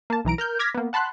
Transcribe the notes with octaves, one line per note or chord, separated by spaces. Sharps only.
A#3 A5
B1 E3 A#5 D7
A#4 F6 G6
D6 F6 G#6 A#6 B6
A#3 B3
F#5 A5 B5 C6 F#6